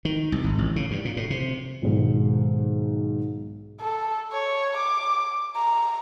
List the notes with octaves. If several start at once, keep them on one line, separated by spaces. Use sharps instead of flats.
D#3
C2
G#1
A1
C#3
G2
A#2
A2
C3
B1 G#2 D#3
A4
C#5
D6
A#5